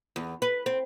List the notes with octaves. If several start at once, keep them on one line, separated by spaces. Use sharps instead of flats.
E2
B4
C4